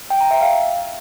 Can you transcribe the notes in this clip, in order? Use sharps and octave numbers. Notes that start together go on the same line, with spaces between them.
G5
A#5
E5
F5